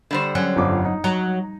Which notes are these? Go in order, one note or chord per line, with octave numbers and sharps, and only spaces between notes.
D3 G3 C5
F#3 C#4
G1 F2 D6
D#4
F#3 A#5